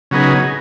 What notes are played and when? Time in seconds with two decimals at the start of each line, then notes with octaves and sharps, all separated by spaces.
0.11 C#3 F#3 B3 D#4 G#4